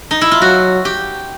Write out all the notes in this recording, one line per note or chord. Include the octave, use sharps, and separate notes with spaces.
D#4
E4
F4
F#3 F#4
G4